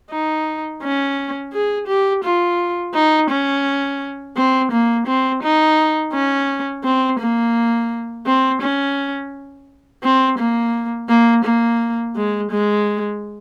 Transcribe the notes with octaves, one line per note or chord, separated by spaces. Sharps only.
D#4
C#4
G#4
G4
F4
D#4
C#4
C4
A#3
C4
D#4
C#4
C4
A#3
C4
C#4
C4
A#3
A#3
A#3
G#3
G#3